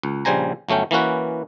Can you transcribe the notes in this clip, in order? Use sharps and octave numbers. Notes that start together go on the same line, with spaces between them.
C#2
A#1 C#3 G3 C5 G#5 A#5
G1 F#3 A3 C#4 G5
E3 A#3 C#4 F#4 B4